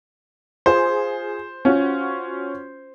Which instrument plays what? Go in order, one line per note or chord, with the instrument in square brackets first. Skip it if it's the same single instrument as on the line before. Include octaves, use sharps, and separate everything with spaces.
[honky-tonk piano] F4 G#4 [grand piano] C5
[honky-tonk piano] C#4 F4 F#4